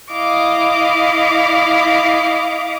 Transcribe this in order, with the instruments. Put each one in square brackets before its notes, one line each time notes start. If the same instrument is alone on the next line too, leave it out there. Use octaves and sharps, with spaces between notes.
[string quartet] E4 D#5 F5 D6